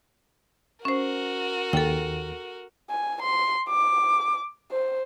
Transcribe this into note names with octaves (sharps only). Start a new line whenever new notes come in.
C#4 F#4 A#4 C5
D#2 A4 G5
G#5
C6
D6
C5